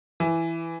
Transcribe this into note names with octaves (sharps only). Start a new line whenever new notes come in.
E3